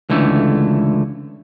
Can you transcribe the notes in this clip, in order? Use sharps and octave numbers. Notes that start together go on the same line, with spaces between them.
C#2 D3 E3 A3